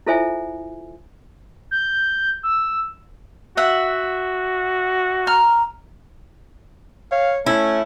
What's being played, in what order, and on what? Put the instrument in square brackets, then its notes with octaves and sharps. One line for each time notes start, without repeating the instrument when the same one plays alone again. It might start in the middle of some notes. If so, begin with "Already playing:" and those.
[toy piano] E4 F4 A4 C5 E5 G#5
[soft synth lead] G6
E6
[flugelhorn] F#4 [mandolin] E5 F#5
[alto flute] A#5 [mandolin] F6
[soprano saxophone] C#5 [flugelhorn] F5
[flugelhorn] A3 [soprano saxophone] C#4 [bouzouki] E4